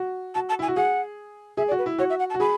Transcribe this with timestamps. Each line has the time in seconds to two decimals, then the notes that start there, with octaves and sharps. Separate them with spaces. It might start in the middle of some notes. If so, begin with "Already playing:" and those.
Already playing: F#4
0.35 F#4 A5
0.49 A5
0.59 E4 G#5
0.68 F#4
0.76 G#4 F#5
1.57 G#4 E5
1.68 D5
1.71 F#4
1.78 B4
1.86 E4
1.98 F#4 C#5
2.10 E5
2.19 F#5
2.30 A5
2.34 F#4
2.40 G#4 B5